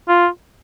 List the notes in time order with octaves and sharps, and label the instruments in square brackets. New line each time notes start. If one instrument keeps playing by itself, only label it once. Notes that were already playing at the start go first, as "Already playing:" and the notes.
[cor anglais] F4